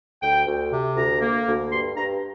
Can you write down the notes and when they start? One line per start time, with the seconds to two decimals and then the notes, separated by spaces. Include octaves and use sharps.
0.22 D2 G5
0.47 D2
0.71 C3
0.96 D2 A#5
1.21 A#3
1.47 D2
1.72 G2 C6
1.97 G2 A#5